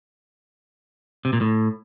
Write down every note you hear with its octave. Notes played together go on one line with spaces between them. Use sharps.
C3
A#2
A2